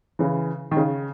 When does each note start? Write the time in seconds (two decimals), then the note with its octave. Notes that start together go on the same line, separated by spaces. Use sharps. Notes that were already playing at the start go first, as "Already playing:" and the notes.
0.19 C#3 E3
0.71 D#3
0.77 C#3